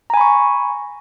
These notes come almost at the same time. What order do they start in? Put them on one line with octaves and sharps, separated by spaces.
A#5 G#5 B5 C#6